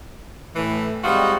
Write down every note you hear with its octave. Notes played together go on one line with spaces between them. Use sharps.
A2 E3
G3 G#3 C4 D#4 F4 F#4